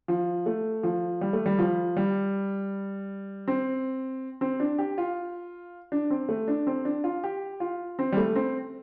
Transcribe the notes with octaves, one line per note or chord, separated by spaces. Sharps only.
F3
A3
F3
G3
A3
G3
F3
G3
C4
C4
D4
G4
F4
D4
C4
A3
D4
C4
D4
F4
G4
F4
C4
G3
A3
C4